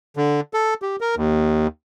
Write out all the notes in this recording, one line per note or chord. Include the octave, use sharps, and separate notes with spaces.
D3
A4
G4
A#4
D#2